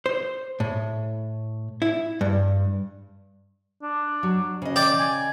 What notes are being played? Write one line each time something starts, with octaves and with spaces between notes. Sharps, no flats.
C5
A2
E4
G2
D4
F#3
C#3 D#5
D5 G5
G#5